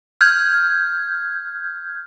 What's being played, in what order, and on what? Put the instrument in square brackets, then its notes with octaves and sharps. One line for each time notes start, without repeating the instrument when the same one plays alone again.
[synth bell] F6 G6 G#6